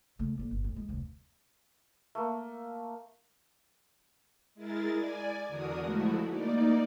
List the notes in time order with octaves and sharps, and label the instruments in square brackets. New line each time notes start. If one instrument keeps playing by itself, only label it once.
[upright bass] C#3 A3
F2 A#2
G1
D2
G#3
F1 D2
[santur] A3 A#3
[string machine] G#3 E4 G#4 A#4 A6
D5 G#5
E2 D3 D4 F#4 A#4 D#6
F3 G#3 A3 E4 F#4
A#3 D#4 D5